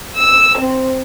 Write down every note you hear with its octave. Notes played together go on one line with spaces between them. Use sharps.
E6
C4